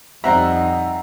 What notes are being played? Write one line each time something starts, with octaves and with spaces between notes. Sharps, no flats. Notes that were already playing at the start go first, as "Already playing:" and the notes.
F2 G3 C4 D#4 E5 F#5 A#5